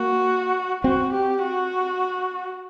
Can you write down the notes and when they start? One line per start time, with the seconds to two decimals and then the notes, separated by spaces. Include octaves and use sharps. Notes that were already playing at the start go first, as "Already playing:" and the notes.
Already playing: A#3 F#4
0.84 C4 F#4
1.13 G4
1.43 F#4